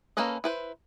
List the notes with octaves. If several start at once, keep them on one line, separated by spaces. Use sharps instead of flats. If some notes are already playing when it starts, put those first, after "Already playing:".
A#3 C#4 A4 B4 D#5
E4 B4 C5